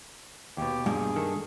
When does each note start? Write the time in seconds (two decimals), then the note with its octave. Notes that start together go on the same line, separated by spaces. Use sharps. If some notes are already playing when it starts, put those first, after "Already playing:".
0.57 D#2 B2 G4
0.86 G2 G#4
1.16 D#3 A4